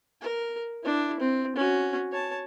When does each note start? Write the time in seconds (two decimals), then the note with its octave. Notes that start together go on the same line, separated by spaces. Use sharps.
0.21 A#4
0.83 D4 E4
1.20 C4
1.56 C#4 F#4
2.12 C#5 A5